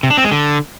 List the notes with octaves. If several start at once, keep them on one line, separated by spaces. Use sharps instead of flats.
C3
D4
C4
G#3
D3